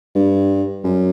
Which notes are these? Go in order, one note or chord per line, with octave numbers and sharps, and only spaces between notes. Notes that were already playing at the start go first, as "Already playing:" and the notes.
G2
F#2